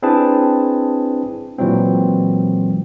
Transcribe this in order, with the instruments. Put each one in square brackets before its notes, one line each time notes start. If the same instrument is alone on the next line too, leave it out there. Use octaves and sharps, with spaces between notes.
[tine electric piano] C4 D4 E4 G#4 B4 A5
A#2 E3 F#3 G#3 C4